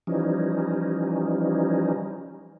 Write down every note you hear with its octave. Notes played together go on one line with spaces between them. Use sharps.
E3 F3 G3 C#4 D#4